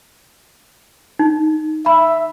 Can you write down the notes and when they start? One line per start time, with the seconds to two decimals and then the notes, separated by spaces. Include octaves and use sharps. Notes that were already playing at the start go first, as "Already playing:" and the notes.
1.19 D#4
1.86 E5 B5